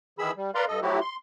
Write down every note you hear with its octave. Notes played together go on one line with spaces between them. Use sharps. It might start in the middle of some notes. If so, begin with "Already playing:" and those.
D#3 E3 G#4 B5 E6
G3
A#4 B4 D5 F5 A#5 C6
G2 A4 D#5
F3 F#3 A3 E4 F#4 G4
C6